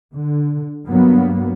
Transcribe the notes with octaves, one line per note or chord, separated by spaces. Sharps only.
D3
G2 F#3 A#3 B3